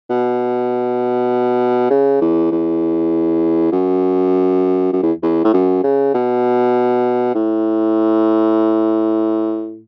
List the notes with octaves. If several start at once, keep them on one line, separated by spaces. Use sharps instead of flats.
B2
C#3
E2
E2
F#2
F#2
E2
E2
A2
F#2
C#3
B2
A2